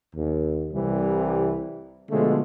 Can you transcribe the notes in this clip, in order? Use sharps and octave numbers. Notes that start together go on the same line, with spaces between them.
D#2
C2 C3 E3 G3
B2 D3 F3 G#3 A3